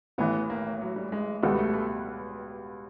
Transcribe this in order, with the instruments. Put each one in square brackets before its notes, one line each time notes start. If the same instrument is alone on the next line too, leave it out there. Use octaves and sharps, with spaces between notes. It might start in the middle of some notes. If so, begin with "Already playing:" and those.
[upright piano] A1 A2 E3 [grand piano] B3
[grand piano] A#3
F#3
G3
G#3
[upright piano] C#2 B2 G3 B3 [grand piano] A3
[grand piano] A3
A3